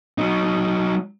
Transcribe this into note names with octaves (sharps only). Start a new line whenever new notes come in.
F#3 D#4